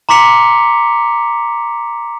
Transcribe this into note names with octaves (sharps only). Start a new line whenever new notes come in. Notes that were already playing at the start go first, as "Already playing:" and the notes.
A#5 C6 D6 B6 C#7 F7